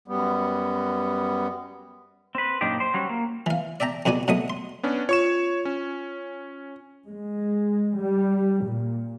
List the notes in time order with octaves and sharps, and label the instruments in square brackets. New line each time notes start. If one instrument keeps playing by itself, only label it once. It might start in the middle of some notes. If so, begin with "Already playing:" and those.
[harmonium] F#2 G3 B3
[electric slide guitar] C4 B4
F#2 A#2 D4 D#4 G4
C5
F#3 G3 C#4
A#3
[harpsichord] E3 F5
D5 E5 G5 A5 A#5
F2 B2 F#4 D5 G#5
B2 F#3 A3 D#6
C6
[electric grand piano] B3 C#4 D4
[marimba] F4 [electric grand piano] C#5 C#6 E7
[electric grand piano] C#4
[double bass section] G#3
G3
A#2